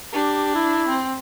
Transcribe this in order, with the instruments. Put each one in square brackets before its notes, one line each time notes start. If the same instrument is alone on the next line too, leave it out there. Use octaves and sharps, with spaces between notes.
[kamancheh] D4 [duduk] G4
[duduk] E4
[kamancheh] C4